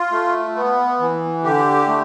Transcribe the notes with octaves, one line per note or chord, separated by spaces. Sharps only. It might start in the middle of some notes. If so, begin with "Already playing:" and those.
Already playing: F4
A3
B3
E3
D3 G4
A3